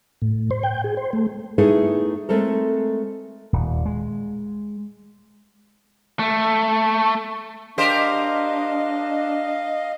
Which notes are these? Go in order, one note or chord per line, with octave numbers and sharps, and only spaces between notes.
A2
C5
G5
G#4
C5
A3
A3 B3 D#4 E4 G#4 A4
G#3 A3 C4 A4 A#4
D#1
G#3
A3
D4 G4 A#4 C5 D#5 F5